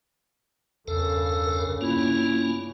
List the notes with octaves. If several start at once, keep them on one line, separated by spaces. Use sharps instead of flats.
E2 G2 C#3 A4 A#4 F5
A#3 C#4 E4 F4